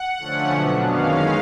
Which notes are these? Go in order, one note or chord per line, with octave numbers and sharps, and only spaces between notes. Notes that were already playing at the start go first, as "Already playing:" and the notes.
Already playing: F#5
D3 F3 A3 C#4
B2 F#3 B3 D4
F#2 D#3 G#3 C#4 F5